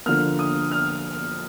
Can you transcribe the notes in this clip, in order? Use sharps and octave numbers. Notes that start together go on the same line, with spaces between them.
D3 F3 A#3 F6
D#6
F6